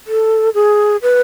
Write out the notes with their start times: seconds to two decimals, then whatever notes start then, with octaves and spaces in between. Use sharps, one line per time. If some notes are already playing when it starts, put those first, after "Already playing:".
0.07 A4
0.55 G#4
1.02 B4